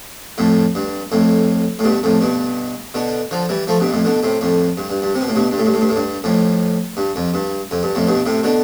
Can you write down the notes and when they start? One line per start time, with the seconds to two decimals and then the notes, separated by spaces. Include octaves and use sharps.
0.38 F2 A2
0.75 G2
1.12 F2 A2
1.79 A2
1.84 G2 B2
2.03 F2 A2
2.21 G2 B2
2.94 B2 D3
3.31 D3 F3
3.49 E3 G3
3.67 F3 A3
3.80 G2 B2
3.92 F2 A2
4.05 B2 D3
4.23 A2 C3
4.41 F2 A2
4.78 G2
4.90 G2
5.02 G2
5.15 C3
5.21 B2
5.28 A2
5.35 G2 B2
5.51 G2
5.58 A2
5.66 G2
5.74 A2
5.81 G2
5.89 A2
5.96 G2
6.24 F2 A2
6.97 G2
7.16 F2
7.34 G2
7.71 F2
7.83 G2
7.95 F2 A2
8.07 G2 B2
8.26 A2 C3
8.43 B2 D3